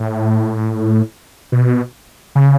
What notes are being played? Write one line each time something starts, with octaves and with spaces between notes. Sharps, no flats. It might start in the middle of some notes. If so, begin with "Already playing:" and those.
Already playing: A2
B2
C#3